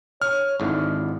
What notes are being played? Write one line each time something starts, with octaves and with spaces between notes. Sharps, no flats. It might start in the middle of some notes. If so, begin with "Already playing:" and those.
C#5 F6
G#1 G#2 D3 E4